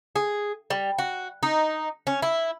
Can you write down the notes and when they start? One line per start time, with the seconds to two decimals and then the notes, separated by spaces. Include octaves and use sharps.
0.16 G#4
0.70 G3
0.98 F#4
1.43 D#4
2.07 C#4
2.22 E4